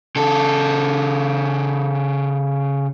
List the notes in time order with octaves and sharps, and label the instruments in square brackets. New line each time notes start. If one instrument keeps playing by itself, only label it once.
[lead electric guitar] C#3 A4